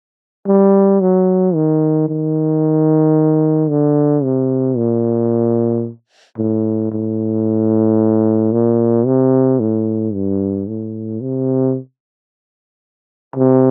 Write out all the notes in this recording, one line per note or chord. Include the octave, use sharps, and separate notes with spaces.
G3
F#3
D#3
D#3
D3
C3
A#2
A2
A2
A#2
C3
A2
G2
A2
C3
C3